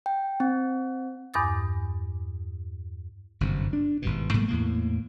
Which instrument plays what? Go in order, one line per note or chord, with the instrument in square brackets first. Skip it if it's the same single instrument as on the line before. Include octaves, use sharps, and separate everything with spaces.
[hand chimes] G5
C4
[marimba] E2 G2 D6 D#6 A6
[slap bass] G1 F#2 C3
D4
G#1 G2 B2
G#2 F#3 A3 A#3
E2 A2 A#3